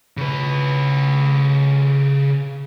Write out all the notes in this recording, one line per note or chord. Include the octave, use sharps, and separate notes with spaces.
C#3 B4